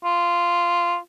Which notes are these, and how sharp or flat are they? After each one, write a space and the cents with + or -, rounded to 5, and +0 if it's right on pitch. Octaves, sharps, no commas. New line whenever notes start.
F4 -10